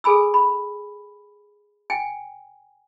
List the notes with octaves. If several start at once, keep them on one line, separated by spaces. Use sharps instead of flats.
G#4 A4 G#5 B5 E6
B5
G5 G#5